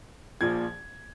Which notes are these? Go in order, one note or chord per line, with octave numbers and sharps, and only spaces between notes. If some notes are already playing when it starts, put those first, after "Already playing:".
A#1 A#2 F3 G#6